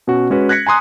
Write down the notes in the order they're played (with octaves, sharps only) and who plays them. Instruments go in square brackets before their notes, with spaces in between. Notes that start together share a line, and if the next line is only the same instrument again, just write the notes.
[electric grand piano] B2 C#4 F#4
G#3 C#4 F#4 B4
F#6 G#6 A#6 B6 C#7
G#5 A#5 C6 D#6 F#6